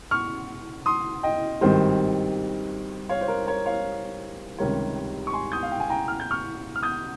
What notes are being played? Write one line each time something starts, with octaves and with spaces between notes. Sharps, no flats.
C#6 F6
C6 D#6
D#5 G5
G#1 G2 D#3 G3 C5 D#5
C#5 F5
C5
A#4
A#4 C#5
C#5 F5
C#2 C3 D#3 G3 A#4 C#5
C#6
G#5 C6
D#6 G6
F5
G5
G#5
G5 A#5
F6
G6
C#6 F6
F6
D#6 G6